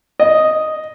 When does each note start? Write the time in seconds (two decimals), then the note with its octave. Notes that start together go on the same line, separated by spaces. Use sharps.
0.20 D#5